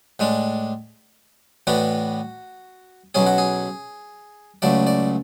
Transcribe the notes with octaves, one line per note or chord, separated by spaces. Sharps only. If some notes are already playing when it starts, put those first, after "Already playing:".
A2 G#3 D4
A2 E3 B3 D4 F#4
B1 B2 F#3 C#4 G#4
F#4
G#4
C#2 C#3 F#3 A3 D5
D5